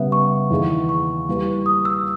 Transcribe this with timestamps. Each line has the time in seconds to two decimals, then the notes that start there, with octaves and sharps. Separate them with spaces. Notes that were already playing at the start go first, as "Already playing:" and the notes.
Already playing: C#3 G3 B3 E5
0.12 C#6
0.50 E2 D#3 A#3 E4 G#4
0.89 C#6
1.28 G3 A#3 E4 G4 B4
1.66 D#6
1.85 E6